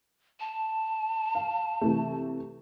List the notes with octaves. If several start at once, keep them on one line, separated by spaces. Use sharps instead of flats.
A5
F5
C3 E3 A3